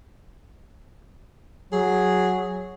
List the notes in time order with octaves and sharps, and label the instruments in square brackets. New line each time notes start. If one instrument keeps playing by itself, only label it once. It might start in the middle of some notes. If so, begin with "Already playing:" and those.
[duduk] F#3 [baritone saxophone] G#4